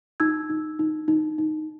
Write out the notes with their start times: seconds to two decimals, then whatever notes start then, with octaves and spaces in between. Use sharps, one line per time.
0.20 D#4 E6 G#6
0.50 D#4
0.79 D#4
1.08 D#4
1.38 D#4